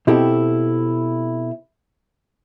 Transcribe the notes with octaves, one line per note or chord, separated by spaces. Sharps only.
B2 C4 E4 G4 A4